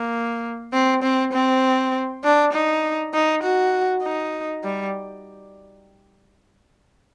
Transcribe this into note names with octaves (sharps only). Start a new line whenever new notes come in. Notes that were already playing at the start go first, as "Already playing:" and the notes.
Already playing: A#3
C4
C4
C4
D4
D#4
D#4
F#4
D#4
G3